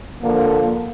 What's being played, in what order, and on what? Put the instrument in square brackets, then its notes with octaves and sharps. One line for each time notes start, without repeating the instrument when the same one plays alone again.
[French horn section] D3 F3 A#3